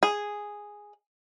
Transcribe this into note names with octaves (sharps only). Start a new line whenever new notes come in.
G#4